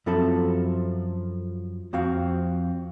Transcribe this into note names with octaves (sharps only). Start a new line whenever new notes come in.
F#2 F3 C4 A4 E5 B5
F2 C4 F#4 F5